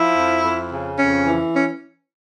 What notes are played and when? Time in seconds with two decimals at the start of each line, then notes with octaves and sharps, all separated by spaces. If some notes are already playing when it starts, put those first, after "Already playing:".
Already playing: F3 E4
0.16 F2
0.44 F2
0.72 C#3
0.99 F2 C#4
1.27 E3
1.56 C#4